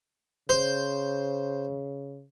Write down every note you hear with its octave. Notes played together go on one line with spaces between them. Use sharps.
C#3 C5